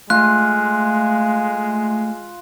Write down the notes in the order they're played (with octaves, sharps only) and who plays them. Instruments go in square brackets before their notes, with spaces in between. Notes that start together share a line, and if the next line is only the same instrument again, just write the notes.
[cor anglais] G#3 [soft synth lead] A3 [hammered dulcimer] F4 [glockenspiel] F#6